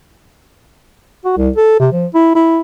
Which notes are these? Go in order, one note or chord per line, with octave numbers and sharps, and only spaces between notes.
F#4
C2
A4
C3
F3
E4
E4